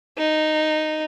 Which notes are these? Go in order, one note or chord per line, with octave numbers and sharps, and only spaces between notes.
D#4